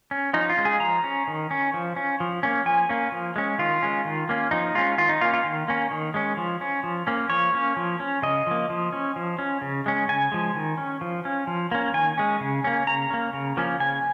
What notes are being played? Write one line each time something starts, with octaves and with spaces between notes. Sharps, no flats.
C#4
F3 D#4
F4
G#3 C#4
G#4
F3 A#5
C#4
D#3
C#4
F3
C#4
F3
A#3 C#4
F3 G#5
A#3 C#4
F3
G#3 C#4
D#3 F4
G#3 C#4
D#3
A#3 C#4
F3 D#4
G#3 C#4 F4
D#3 F4
D#4
A#3 C#4 F4
F4
D#3
A#3 C#4
D#3
G#3 C#4
F3
C#4
F3
A#3 C#4
F3 C#5
A#3 C#4
F3
C#4
C#3 D#5
F3 A#3
F3
C#4
F3
C#4
C#3
G#3 C#4
C#3 G#5
F3 G#3
D#3
C#4
F3
C#4
F3
A#3 C#4
D#3 G#5
G#3 C#4
C#3
A#3 C#4
C#3 A#5
A#3 C#4
C#3
F3 A#3 C#4
C#3 G#5